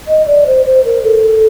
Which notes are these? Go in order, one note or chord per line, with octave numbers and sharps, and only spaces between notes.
D#5
D5
C5
C5
A#4
A4